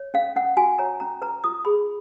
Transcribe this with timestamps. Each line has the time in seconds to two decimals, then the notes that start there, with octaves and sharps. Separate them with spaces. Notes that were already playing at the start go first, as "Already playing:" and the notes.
Already playing: C#5
0.14 C#4 F5
0.36 C#4 F#5
0.57 F#4 G#5
0.78 C#5 A#5
1.00 C#4 A#5
1.22 B4 A#5
1.44 F4 D#6
1.65 G#4 B5